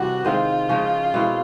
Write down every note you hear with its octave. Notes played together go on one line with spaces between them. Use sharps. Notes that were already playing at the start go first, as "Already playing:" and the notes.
Already playing: C3 E3 G3 D4 F#4
D#3 G#3 C4 F4
C#3 F3 G#3 C#4
B2 G#3 C4 E4